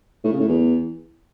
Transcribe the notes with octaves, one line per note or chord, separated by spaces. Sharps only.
A2
C#3
A2
E2